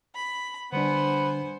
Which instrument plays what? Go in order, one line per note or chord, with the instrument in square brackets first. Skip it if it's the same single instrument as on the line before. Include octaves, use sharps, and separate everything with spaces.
[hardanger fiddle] B5
[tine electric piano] D3 G3 D4 [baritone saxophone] B3 [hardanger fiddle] C5 G#5